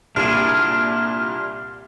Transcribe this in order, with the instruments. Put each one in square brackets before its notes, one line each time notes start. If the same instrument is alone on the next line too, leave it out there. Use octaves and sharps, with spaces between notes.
[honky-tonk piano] C2 A#2 G3 [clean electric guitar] D4 E4 G#4 [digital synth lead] F6